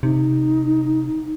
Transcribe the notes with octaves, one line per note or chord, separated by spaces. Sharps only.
C3 D#4